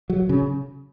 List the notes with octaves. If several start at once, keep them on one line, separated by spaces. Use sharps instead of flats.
F#3
C#3